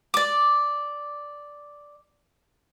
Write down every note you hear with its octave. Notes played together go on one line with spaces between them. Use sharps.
D5 D6